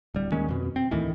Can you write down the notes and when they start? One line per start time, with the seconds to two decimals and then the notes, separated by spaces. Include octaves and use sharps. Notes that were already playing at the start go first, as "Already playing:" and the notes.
0.14 D1 G3
0.32 D#2 D#3 G#3 C#4
0.49 F2 B2
0.76 C4
0.91 D2 A2 D#3 E3